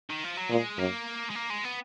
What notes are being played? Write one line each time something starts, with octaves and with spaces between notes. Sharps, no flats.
D#3
F3
F#3
A#2 G#3
F#2 A#3
G#3
A#3
G#3
B3